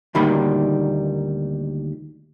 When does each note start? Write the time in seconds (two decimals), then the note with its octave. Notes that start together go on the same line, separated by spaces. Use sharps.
0.15 D2 A#2 D#3 G3 B5